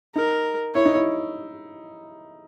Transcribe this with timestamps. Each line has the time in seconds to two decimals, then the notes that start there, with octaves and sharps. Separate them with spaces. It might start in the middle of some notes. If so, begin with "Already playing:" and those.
0.15 D#4 A#4
0.75 E4 C#5
0.85 D#4
0.95 E4